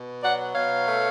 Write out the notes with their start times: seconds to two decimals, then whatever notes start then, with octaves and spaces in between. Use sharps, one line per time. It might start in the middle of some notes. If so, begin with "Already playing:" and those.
Already playing: B2
0.23 F#3 D5 F#5
0.55 B2 C#5 F5
0.87 A3